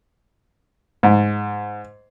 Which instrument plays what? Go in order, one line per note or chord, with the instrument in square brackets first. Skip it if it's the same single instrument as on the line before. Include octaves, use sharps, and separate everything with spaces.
[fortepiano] G#2